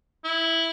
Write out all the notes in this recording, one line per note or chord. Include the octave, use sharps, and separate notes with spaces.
E4